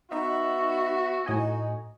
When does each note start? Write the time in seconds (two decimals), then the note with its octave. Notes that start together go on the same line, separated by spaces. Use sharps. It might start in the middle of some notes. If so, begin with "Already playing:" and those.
0.12 B3 D#4 F#4 E5
1.26 A2 D#4 D#5 G#5